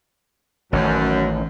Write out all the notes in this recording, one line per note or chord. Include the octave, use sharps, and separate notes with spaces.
A1 F#2 D#3 A3